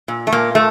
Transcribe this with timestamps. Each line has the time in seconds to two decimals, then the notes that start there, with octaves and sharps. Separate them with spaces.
0.08 A#2
0.27 A3
0.32 A#2 A#3
0.55 A3